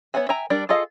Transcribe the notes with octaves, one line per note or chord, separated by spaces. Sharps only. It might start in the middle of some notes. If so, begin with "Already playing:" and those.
B3 C#5 E5 F#5 G#5
E5 G5 G#5 A#5
G3 D4 A#4 D5
F4 G#4 A4 D#5 F5